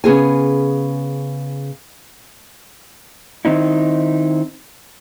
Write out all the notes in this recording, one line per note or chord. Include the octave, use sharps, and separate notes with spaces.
C#3 B3 G#4 G#5
D#3 C4 D#4 E4